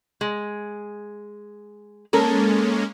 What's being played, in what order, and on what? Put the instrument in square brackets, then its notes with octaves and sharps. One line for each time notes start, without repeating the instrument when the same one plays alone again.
[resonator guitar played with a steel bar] G#3
[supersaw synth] G#3 A#3 C#4 [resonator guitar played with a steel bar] A4 A#4